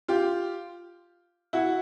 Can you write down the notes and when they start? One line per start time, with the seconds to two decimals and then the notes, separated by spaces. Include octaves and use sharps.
0.08 F4 G4
1.53 E4 F#4